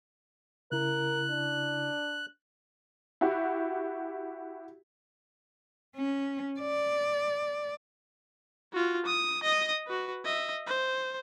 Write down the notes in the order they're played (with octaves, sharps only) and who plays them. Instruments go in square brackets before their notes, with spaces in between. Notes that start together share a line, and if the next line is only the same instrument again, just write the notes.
[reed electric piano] C#3 E4 [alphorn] A#4 [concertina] F#6
[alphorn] D4
[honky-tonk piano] E4 F#4 G4
[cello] C#4
D5
[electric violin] F4 F#4
D#6
D#5 D#6
F#4 B4
D#5 E5
C5